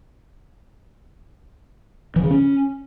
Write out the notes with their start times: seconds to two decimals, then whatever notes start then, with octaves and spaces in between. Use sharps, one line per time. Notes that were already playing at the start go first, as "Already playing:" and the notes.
2.16 E3
2.23 C#3
2.31 C#4